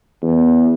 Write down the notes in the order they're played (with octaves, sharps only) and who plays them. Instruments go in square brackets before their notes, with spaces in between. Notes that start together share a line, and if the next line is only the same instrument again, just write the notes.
[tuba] E2